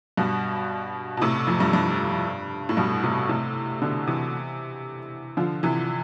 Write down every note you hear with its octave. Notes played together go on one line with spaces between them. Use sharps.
G2 B2
B2
A2 C3
F2 A2
G2
G2
A2
G2 B2
A2 C3
A2 C3
B2 D3
C3 E3
D3 F3
C3 E3